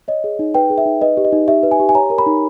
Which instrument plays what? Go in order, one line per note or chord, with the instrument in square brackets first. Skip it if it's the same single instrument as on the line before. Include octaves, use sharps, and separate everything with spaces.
[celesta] C#5 D#5
G#4
D#4
B4 G5
G#4
E5
D#4
B4 D#5
G4
D#5
D#4
G4 E5
B4
G#5
G4
G#5
C#5 A#5
A#4
B5
D#4